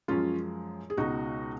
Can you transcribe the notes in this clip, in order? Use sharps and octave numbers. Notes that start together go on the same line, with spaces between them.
F#2 F3 G#3 C#4 F4
G#4
C#2 B2 G#3 D#4 F#4